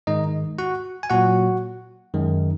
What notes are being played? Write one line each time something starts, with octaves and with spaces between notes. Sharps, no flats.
G#2 D#3 G#3 D#4 D#5
F#4 F#5
G#5
A#2 F#3 F#4 F#5
F#2 D#3 G#3